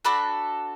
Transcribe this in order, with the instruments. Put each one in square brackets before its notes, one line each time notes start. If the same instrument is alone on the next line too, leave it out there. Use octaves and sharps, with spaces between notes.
[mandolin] D4 F#4 A4 B5